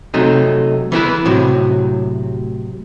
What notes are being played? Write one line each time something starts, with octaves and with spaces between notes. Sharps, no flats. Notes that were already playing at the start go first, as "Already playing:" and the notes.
C3 F#3 A3 D#4
E3 B3 E4 B4
A2 C3 F#3